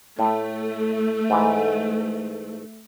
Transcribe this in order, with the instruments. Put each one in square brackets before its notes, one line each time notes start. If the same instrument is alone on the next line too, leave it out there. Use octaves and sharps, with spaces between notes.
[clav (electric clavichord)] A2 [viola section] A3
[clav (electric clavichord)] G#2 E3